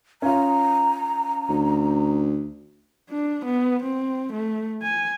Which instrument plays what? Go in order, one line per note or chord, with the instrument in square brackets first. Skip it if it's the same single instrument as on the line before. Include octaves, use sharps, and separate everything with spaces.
[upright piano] C#4 F4 [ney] A#5
[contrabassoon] D2
[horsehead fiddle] D4
B3
C4
A3
G#5